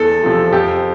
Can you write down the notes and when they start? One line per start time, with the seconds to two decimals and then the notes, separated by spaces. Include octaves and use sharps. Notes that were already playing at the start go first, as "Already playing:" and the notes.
Already playing: E2 A4
0.23 C3 F3
0.53 F2 G4